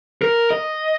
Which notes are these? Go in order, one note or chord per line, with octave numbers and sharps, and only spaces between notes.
A#4
D#5